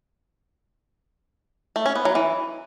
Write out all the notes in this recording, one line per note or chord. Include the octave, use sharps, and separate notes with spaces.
A3
C#4
B3
F#3
E3